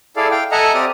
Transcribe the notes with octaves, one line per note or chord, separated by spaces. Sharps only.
E4 G#4 A4 D5 F5
F5 G5
A4 D#5 E5 F#5 G#5 A#5
C4 G4 D5 D#6 F6